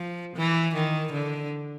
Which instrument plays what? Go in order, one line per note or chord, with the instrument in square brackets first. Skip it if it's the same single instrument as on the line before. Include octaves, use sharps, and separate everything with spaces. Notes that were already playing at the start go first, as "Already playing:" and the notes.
Already playing: [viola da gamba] F3
E3
D#3
D3